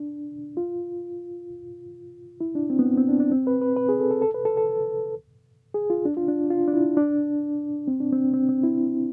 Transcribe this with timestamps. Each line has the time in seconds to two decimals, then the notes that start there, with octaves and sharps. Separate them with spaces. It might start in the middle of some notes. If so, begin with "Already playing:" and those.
Already playing: D4
0.57 F4
2.41 E4
2.55 D4
2.70 C4
2.79 B3
2.86 C4
2.97 C4
3.08 D4
3.20 D4
3.31 C4
3.47 B4
3.61 B4
3.76 B4
3.89 G#4
4.00 A4
4.11 A4
4.22 A4
4.34 B4
4.45 A4
4.57 A4
5.74 G#4
5.90 F4
6.05 D4
6.17 F4
6.28 D4
6.50 F4
6.68 D4
6.73 E4
6.97 D4
7.88 C4
8.00 D4
8.12 C4
8.33 C4
8.49 C4
8.64 E4